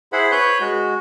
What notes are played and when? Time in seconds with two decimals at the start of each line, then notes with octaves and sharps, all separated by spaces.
0.13 E4 G#4 C5 F#5 B5
0.32 B4 C#5 F#6 G6
0.60 G#3 F#4